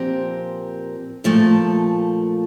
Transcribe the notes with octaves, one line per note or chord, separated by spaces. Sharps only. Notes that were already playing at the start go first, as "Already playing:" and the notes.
Already playing: A#2 F3 C4 G4 A#4
A#2 F3 A3